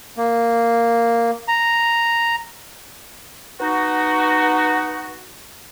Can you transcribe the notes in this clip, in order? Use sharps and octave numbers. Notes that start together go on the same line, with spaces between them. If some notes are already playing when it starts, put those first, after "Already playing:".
A#3
A#5
B3 D#4 F#4